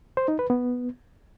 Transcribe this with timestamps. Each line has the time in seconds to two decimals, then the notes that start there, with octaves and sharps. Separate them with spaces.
0.17 C5
0.28 D#4
0.39 B4
0.50 B3